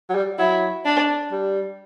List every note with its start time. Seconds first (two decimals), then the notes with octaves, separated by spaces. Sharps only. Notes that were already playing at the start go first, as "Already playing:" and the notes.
0.09 F#3
0.15 G3
0.39 F#3 E4
0.85 D4
1.32 G3